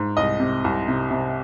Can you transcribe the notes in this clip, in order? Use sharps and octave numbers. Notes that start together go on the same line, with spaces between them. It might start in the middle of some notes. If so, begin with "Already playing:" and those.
Already playing: G#2
C2 D#5
C3
C2
C3
C3